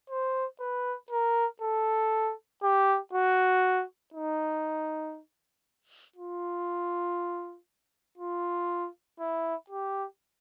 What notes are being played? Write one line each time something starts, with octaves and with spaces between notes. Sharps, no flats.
C5
B4
A#4
A4
G4
F#4
D#4
F4
F4
E4
G4